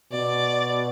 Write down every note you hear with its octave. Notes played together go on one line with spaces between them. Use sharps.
B2 D5